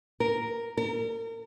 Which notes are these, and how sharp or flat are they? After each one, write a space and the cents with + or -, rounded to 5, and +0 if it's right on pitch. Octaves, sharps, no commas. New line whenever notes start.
A#4 +0
A#4 -35